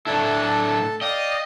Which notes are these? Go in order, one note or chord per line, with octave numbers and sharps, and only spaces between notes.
A2 D4 E4 A4 A5
D5 D#5 F5 G5